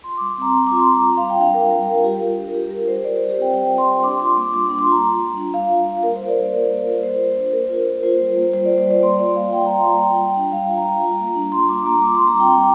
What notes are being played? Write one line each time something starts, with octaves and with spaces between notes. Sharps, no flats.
F4 C6
G3 D6
C6
C4 A#5
G3 C6
F4 D6
C6
G3 A#5
F4
G3 F5
G5
D4 F5
G3 A#4
F4 A#4
G3
F4 G4
G3
D4
A#4
G3 G4
F4 A#4
G3 C5
F4 D5
G3 C5
G4
C4 G5
G3 G5
F4
C6
G3
D4 D6
F4 C6
A#3 D6
G3 D6
D4 D6
C6
F4 A#5
F4
G3
D4
G3 F5
F4
G3
A#3 A#4
F4 C5
D5
F4
A#3 D5
A#3
F4
F4 C5
A#3
D4
A#3 A#4
F4
A#3
F4 C5
G3
A#3
G3 C5
F4 D5
C5
G3 D5
A#3 C6
F4 D5
F4 F5
A#3 G5
A#3 A#5
C6
F4 A#5
F4 G5
G3
D4
G3 F5
F4
A#5
G3
F4
A#3
D4
A#3 C6
F4 D6
A#3 A#5
F4 D6
G3 C6
A#5
C4 G5
G3 G5